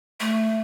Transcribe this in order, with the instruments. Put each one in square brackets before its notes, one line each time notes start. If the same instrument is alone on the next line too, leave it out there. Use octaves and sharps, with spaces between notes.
[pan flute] A3